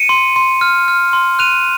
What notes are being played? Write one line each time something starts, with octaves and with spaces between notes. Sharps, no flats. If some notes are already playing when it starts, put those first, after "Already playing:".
Already playing: C#7 D#7
C6
C6
F6
F6
C6
F#6 D#7 F7